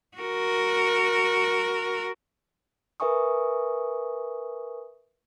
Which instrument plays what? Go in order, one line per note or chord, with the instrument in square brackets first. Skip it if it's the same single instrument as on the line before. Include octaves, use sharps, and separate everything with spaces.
[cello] F#4 A#4
[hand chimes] A#4 B4 E5 G#5 C#6 D#6